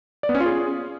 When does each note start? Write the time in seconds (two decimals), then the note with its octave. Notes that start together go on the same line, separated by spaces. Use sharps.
0.23 D5
0.29 B3
0.35 C#4
0.40 F4
0.46 G#4